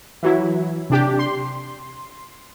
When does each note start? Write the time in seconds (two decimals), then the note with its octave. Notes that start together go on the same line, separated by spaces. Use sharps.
0.23 E3 F#3 E4
0.90 C3 D4 G4
1.19 C6